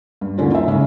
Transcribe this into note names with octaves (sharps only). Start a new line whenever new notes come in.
G2
D#2 A2 D3 C#4 F4
D#4 E5
G#2 C#3 G#3